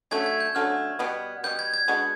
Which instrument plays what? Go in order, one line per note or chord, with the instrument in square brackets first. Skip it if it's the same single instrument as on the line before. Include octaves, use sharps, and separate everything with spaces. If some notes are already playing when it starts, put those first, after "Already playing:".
[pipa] D3 F#3 A3 C#4 [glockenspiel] G#6
[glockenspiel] G#6
G6
[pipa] D3 F#3 A3 C#4 [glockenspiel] F6
[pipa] B2 G3 B3
[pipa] B2 G3 B3 [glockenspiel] G6
[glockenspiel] G#6
G#6
[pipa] G#3 B3 D4 F#4